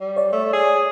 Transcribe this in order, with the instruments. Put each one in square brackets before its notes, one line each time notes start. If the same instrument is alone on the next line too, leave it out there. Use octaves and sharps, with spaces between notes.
[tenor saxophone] G3
[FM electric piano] C#5 D5
[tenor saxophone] A3
G#4